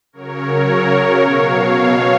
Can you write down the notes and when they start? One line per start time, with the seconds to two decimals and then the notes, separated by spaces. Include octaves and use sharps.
0.13 C#3 F#3 A#4 C#5
1.20 B2 F#3 C#5 F5
1.74 C#5 F5